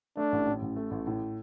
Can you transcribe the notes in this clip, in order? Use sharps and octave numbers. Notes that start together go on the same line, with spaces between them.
A3 D4
A1
A2
A1
A3
A1
A2